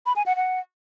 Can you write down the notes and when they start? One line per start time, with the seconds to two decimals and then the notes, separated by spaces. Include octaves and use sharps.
0.06 B5
0.16 G#5
0.26 F#5
0.36 F#5